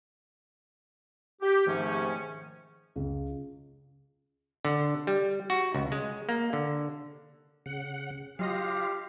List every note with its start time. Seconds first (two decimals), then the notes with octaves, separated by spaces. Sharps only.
1.42 G4
1.66 G#2 C3 D#3 F3 A3 C#4
2.96 C#2
4.65 D3
5.07 G3
5.50 F#4
5.75 C#2
5.92 G#3
6.29 A#3
6.53 D3
7.66 C#3 F#5
8.39 F#3 F4 G4 D#5 F5 A#6